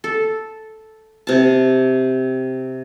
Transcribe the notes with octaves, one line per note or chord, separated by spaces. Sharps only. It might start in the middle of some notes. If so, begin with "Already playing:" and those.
A4
C3 A5